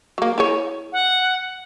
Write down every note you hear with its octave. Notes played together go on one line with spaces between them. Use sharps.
F#3 A#3
E4 G#4 C#5
F#5